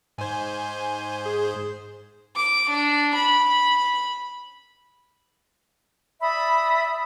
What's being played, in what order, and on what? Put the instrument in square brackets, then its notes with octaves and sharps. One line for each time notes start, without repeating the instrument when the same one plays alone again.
[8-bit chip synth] G#2 C5 [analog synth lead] G#5
[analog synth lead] G#4
[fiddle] D6
D4
B5
[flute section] D5 E5 B5 D#6